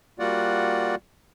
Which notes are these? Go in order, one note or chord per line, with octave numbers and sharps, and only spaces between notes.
G3 A#3 F4 F#4 D5 F#5